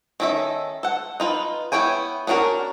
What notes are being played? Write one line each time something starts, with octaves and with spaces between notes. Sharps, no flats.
D#3 C#4 A4 D#5 E5
A4 F#5
D#4 F4 B4
B3 E4 C#5 G5 G#5
B3 C#4 D4 F#4 A#4